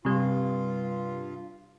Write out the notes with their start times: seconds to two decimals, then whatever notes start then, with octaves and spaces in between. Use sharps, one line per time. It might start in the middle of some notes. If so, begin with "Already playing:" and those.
0.05 G2 C3 G3 F4